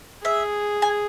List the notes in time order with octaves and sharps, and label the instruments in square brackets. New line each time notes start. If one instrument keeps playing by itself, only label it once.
[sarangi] G#4 [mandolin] E5
[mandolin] G#5